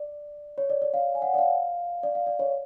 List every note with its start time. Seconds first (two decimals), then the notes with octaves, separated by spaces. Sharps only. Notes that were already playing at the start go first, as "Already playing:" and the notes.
Already playing: D5
0.58 C#5
0.70 D5
0.82 D5
0.94 F5
1.15 G#5
1.22 F#5
1.34 D5
1.38 F5
2.03 D5
2.15 F5
2.27 D5
2.39 C#5